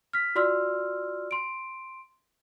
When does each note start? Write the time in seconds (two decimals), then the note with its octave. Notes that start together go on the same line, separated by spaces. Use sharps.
0.13 F6 B6
0.35 F4 F#4 D5 C6 E6 F6
1.31 C6 D7